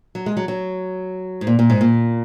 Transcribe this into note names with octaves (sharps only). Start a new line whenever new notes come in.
F#3
G#3
F#3
F#3
G#2
A#2
A#2
G#2
A#2